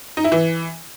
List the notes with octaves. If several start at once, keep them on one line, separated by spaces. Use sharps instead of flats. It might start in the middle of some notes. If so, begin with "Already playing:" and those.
D#4
E4
E3